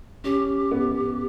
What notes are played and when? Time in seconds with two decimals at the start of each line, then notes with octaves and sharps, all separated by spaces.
0.24 C#4 G4
0.71 B3